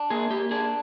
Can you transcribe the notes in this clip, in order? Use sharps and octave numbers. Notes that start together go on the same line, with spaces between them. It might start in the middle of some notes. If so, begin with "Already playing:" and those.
Already playing: D4
A#3 G#4
A#3 G4
D4 G#4